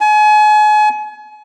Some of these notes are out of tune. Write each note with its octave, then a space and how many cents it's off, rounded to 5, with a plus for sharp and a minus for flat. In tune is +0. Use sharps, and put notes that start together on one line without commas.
G#5 +35